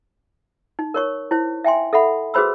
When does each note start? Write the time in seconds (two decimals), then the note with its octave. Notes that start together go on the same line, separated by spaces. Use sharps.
0.79 D#4
0.94 A#4 C#5 C#6
1.31 E4 C5
1.64 E5 G5 G#5 C6
1.93 A4 E5 F#5 B5
2.34 F#4 G#4 B4 C5 B5 E6